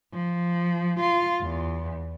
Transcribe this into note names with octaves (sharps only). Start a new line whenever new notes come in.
F3
F4
E2